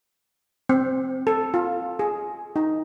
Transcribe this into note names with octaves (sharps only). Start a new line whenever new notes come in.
C4
A4
F4
G#4
D#4